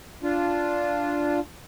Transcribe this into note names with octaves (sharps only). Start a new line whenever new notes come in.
D4 F4